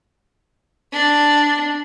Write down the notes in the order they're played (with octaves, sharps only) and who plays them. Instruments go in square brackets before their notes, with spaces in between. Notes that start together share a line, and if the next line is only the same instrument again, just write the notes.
[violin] D4